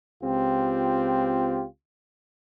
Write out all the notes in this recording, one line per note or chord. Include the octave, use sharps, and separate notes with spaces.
C#2 C4 F4 G4